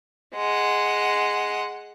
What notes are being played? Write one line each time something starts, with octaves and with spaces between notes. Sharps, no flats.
G#3 F#5